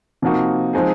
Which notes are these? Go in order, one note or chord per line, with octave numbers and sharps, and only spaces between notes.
C3 F3 A#3 D#4 F#4
F3 G#3 C4 D#4 G#4